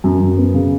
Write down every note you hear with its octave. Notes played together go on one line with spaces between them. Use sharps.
F#2
F#2
B3
C#3